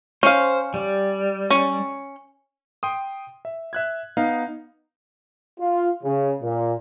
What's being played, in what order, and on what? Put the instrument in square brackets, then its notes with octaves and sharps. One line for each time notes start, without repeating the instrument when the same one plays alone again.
[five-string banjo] C#4 F5 [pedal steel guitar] C5
[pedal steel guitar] G3
[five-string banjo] C#4
[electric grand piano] G5 C6 D#6
E5
E5 F#6 G#6
B3 D#4 F5
[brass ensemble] F4
C#3
A#2